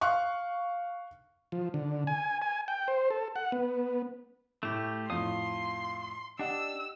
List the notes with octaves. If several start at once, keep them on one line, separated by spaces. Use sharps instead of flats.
F5 C#6 F#6
F3
D3
G#5
G#5
G5
C5
A4
F#5
B3
A2 A3 G4
F2 A2 F5 C6 D#6
D4 G4 D#5 F#5 E6